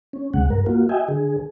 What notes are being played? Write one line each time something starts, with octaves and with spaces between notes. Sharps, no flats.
C#4
D2 C3 G#3 F#5
G2 A#4
A#3 F4 F#4
F#4 D#5 E5 G5 G#5
D3 G#4